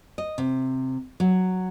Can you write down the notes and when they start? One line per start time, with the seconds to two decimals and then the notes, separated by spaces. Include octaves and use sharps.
0.18 D#5
0.38 C3
1.20 F#3